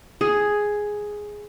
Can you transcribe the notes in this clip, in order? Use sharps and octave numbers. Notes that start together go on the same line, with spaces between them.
G#4